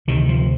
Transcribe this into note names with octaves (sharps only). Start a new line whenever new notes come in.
D2 C3 D#3
F3